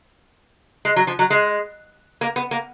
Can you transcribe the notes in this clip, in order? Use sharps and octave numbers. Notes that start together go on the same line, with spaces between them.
G#3
F#3
F3
F#3
G#3
A#3
B3
A#3